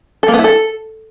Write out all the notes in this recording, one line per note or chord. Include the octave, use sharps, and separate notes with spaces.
A4
A#3
B3
E4
A4